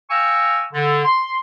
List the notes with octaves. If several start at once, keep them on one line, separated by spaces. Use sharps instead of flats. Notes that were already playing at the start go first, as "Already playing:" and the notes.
F5 G5 G#5 A#5 C#6 E6
D3
C6